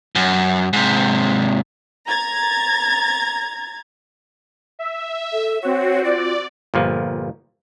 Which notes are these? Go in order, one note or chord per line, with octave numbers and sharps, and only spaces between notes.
F#2
G#2 C3
A#5 G#6 A6
E5
A4
C4 F#4 C#5
F4 D5
G1 A#2 F3